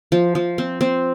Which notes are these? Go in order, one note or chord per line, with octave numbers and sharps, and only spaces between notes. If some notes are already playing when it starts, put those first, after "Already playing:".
F3
F3
C4
C4